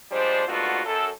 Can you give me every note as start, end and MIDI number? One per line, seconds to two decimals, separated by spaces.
0.11 0.42 53
0.11 0.42 55
0.11 0.42 56
0.11 0.42 62
0.11 0.42 72
0.48 0.80 44
0.48 0.80 57
0.48 0.80 59
0.48 0.80 62
0.48 0.80 65
0.48 0.80 66
0.84 1.08 42
0.84 1.08 69